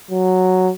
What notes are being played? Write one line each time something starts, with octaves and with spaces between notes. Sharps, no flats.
F#3